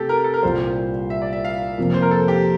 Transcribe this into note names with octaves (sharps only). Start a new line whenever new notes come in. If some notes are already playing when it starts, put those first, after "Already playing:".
Already playing: C3 A3 C4 G4 A4
A#4
A4
A#4
C2 A#2 G3 C5
E5
D5
E5
F5
F2 C3 F3 A#3
C5
A#4
A4
G4